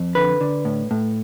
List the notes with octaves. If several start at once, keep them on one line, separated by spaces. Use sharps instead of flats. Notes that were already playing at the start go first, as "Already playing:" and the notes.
Already playing: F2
D3 B4
D3
A2
A2